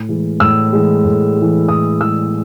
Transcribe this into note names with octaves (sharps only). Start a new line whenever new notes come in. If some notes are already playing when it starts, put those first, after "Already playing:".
Already playing: A2
E3 G#3
A2 E6
E3 G#3
A2
E3 G#3
A2 D#6
E3 G#3 E6